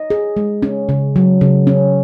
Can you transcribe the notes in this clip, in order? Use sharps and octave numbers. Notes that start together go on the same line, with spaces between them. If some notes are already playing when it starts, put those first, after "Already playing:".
Already playing: D#5
G#4
G#3
C#4
C#3
F#3
C#3
C#4